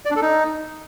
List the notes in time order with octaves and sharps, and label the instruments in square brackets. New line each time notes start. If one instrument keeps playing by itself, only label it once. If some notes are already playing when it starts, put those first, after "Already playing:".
[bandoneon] D5
D4
A4
D#4